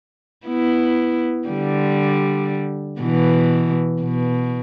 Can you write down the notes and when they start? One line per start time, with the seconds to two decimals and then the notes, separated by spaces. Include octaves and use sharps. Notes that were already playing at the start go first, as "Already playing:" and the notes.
0.47 B3 E4
1.49 D3 G3
3.01 B2 E3
4.03 B2